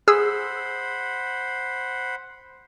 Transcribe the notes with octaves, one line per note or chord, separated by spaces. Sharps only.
G#4 C5 F#5 B5 E6